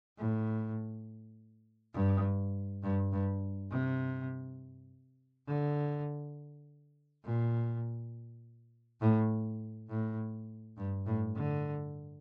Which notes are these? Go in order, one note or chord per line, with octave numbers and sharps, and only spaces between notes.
A2
G2
G2
G2
C3
D3
A#2
A2
A2
G2
A2
D3